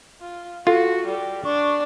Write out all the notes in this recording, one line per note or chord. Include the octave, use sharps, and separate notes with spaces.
F4
F4 F#4 A4
G3
D4 C#6